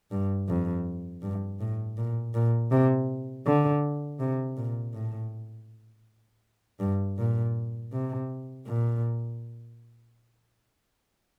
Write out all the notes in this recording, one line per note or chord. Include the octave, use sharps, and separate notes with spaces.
G2
F2
G2
A2
A#2
A#2
C3
D3
C3
A#2
A2
G2
A#2
C3
A#2